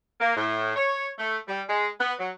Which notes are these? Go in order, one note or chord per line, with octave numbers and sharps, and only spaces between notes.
A#3
A2
C#5
A3
G3
G#3
B3
F#3